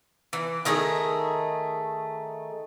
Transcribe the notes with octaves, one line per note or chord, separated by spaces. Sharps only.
E3
D#3 A3 G#4 D#5